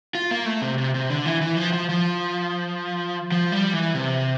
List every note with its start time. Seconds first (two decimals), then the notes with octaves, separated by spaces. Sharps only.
0.15 F4
0.31 A#3
0.46 A3
0.62 C3
0.78 C3
0.94 C3
1.10 D3
1.26 E3
1.41 E3
1.57 F3
1.73 F3
1.89 F3
3.32 F3
3.52 G3
3.73 E3
3.95 C3